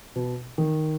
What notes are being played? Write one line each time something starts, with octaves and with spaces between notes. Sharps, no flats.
B2
D#3